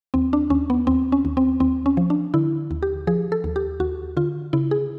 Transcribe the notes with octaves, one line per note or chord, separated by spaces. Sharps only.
D#2 C4
D4
D#2 C#4
B3
D#2 C4
C#4
D#2
C4
D#2 C4
C#4
F3
D4
D3 E4
D#2
G4
F3 G#4
A4
D#2
G4
D#2 F#4
D3 F4
C#3 E4
G#4